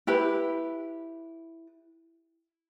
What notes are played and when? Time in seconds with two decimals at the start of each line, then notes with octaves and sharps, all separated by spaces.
0.07 E4 G4 B4